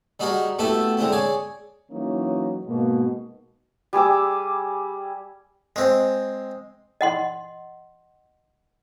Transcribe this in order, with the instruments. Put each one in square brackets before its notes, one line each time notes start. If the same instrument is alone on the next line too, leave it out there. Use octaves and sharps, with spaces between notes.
[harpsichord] G3 D#4 F#4 G#4 A#4
A3 B3 E4 F#4 G4 A4
D3 G#3 C4 E4
G#4 C#5 D5 G#5
[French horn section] E3 F#3 A#3 C#4 D#4
G#2 B2 G#3 A#3
[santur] G3 G#4 D6 E6
[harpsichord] G#3 C4
[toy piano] D#5 F#5 C6